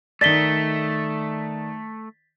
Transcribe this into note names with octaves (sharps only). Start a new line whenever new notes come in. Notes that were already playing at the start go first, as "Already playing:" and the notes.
D#3 A3 D5 A6 B6 G7